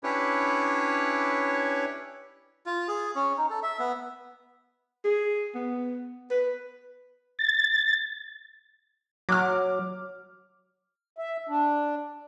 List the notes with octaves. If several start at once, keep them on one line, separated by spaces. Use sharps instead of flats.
C#4 D4 E4 G4 B4 C#5
F4
G#4
C#4
D#4
A4
E5
B3
G#4
B3
B4
A6
F#3 D6 F6
E5
D4